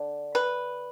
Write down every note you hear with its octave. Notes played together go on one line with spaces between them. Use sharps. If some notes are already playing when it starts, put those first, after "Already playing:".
Already playing: D3
B4